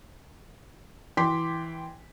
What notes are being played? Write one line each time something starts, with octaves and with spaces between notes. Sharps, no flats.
E3 G5 C6 D6 B6